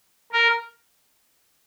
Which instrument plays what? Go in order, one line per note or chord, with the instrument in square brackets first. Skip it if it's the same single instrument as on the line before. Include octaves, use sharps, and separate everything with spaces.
[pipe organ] A#4